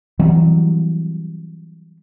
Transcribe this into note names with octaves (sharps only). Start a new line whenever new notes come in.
E3 F#3 G3 C4